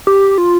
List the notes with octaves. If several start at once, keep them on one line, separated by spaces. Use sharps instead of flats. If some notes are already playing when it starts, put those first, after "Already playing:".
G4
F4